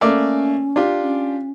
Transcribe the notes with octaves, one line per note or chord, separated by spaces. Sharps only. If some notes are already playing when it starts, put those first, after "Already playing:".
A3 A#3 C#4 D5
D4 F4 G4
C#4